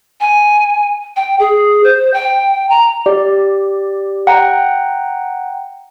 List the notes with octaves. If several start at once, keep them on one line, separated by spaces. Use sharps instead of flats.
G#5
G5
G#4
C5
G5
A#5
G4 D5
F#5 G5 A#5